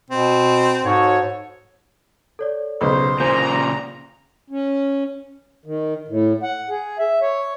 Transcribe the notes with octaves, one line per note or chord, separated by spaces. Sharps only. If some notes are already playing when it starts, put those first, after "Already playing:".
B2 C4
G#2 F#4 A4 C#5
A4 C#5 D5
B1 C#3 C5
A#2 C#3 C5 A#5 G6
C#4
D#3
A2
F#5
G#4
E5
C#5